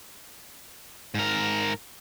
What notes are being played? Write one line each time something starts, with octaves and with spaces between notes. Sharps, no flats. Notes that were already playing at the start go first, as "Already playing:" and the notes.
G#2 A#4